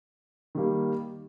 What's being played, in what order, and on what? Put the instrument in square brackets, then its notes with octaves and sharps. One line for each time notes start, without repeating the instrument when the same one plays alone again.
[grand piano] D#3 G3 A#3